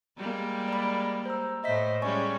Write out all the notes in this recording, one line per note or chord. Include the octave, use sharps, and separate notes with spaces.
G3 G#3 A#3
D5 B5
C5 A#5 E6
A2 C5 D#5 E5 B6
G3 G#3 C#4 D5 G#5 C#6